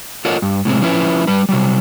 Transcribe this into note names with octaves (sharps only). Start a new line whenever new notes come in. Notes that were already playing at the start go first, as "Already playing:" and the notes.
F4 A4 A#4 C#5 D#5 F#5
G2
A2 C3 G#3 C4
F3 C#4 E4 B4
G3 B4
C3 F#3 G3